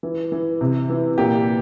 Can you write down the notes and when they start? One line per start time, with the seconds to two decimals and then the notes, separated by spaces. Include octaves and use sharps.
0.03 E3
0.32 E3
0.61 C3
0.89 E3
1.18 A#2 G4